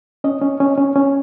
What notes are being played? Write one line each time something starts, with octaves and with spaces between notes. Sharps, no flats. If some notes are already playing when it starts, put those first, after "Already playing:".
C#4 D#5
C#4
C#4
C#4
C#4